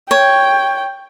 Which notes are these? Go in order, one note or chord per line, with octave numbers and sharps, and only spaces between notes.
C#5 G5